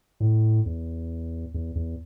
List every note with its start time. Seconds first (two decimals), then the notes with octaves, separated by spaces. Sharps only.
0.20 A2
0.66 E2
1.54 E2
1.75 E2